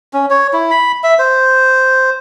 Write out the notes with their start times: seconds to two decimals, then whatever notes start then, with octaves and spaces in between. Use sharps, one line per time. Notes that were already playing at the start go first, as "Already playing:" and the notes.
0.13 C#4
0.30 C#5
0.53 E4
0.71 B5
1.03 E5
1.19 C5